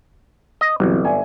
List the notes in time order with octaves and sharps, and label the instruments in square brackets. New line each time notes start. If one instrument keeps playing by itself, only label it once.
[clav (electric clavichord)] D#5
[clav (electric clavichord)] G1 [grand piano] C3 E3 F#3
[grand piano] D5 E5 G#5